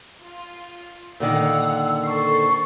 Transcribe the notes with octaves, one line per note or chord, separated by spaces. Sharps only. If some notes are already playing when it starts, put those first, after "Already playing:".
F4
A#2 D3 D#3 F5 F#5 E6
A4 C5 C#6 C7